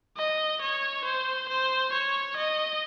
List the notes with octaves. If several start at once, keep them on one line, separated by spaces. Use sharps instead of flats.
D#5
C#5
C5
C5
C#5
D#5